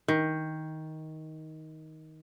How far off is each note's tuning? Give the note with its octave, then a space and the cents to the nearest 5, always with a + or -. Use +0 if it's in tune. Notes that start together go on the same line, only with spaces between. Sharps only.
D#3 +15